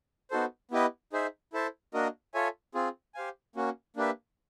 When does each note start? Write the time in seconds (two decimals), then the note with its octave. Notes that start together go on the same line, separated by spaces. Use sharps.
0.31 B3 D#4 F#4 A4 C5
0.71 B3 E4 G4 B4 D#5
1.13 D#4 G#4 C5 E5
1.53 E4 A4 C5 E5 A5
1.94 A#3 D4 F#4 A#4 D#5
2.34 F4 A4 C#5 E5 G#5
2.74 C4 F4 G#4
3.15 G4 C5 F5 G#5
3.56 A#3 C#4 F#4
3.96 A#3 D4 G4 B4 E5